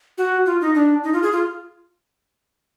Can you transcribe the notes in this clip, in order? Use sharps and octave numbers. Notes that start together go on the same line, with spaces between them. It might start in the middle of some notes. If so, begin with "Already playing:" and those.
F#4
F4
D#4
D4
D#4
F4
G#4
F4